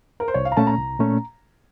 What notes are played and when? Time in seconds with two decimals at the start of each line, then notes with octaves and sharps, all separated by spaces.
0.20 A#4
0.28 C5
0.34 C2 C#5
0.45 F5
0.52 A#5
0.57 A#2 A3 C#4 A5
0.67 A#5
0.78 C2
0.99 A#2 A3 C#4